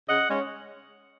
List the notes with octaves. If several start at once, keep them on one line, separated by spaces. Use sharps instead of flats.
C#3 D#5 F#5
G#3 C#4